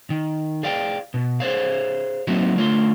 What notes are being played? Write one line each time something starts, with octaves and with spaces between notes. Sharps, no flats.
D#3
G#4 D5 F5 G5
B2
G#4 C5 C#5 F5
F#3 A#3 C4 D#4 E4 F#4
D3 A3 F4 C#5 C6